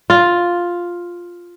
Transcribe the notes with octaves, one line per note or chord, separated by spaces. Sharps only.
F4